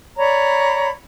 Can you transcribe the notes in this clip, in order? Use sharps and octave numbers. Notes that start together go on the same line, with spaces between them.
C#5 D5 A#5 B5